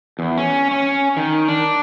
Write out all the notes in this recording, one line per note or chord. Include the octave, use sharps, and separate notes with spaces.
E2
C#4
C#4
D#3
D4